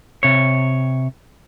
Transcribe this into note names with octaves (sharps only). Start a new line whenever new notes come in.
C3 C#5